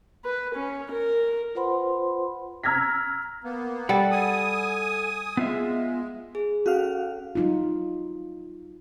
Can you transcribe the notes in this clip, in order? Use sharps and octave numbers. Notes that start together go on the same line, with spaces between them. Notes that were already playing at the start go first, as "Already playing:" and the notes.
B4
C#4
A#4
F4 B4 C5 F#5 B5 C6
A#5 E6 F6 G#6 A#6 B6
A#3 B3
G3 A4 F#5
G#5 D#6
G#3 B3 F4 E5
G#4
C#4 F#4 A4 F5
F#3 D#4 F4